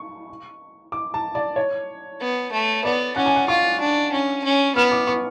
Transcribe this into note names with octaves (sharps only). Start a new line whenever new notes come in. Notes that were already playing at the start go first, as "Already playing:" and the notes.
Already playing: C#6
D6
A5
D5
C#5
B3
A3
B3 D5
C#4 F#5
G#5
F#5
F4 C#6
D4
C#4
C#4
B3 F6
D6
C#6